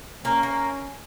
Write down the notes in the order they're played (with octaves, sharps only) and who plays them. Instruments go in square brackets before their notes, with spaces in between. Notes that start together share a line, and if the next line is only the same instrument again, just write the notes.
[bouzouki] A#3 [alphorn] C#4
[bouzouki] A#3